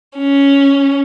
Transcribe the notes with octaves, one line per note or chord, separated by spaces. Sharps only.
C#4